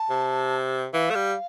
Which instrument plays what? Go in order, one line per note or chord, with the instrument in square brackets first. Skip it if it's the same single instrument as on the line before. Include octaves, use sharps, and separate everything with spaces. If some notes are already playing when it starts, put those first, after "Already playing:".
Already playing: [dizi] A5
[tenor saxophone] C3
[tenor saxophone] E3 [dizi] F5
[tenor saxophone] A3
G3